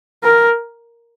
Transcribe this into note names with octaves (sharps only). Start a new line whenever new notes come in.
A#4